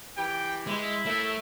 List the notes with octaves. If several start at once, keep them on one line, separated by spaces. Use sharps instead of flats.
E3 G4 G5
G#3 E4
A2 A3 A#4 E5